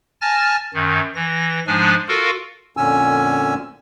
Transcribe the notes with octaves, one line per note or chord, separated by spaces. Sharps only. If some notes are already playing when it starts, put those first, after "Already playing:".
G#5 A5 F6 A6 A#6
F#2 D#3
E3 A#6
G#2 F3 G#3 D4 G#5
F4 F#4 A4 A#4 F5
F2 A#2 D3 C#4 G#5 E6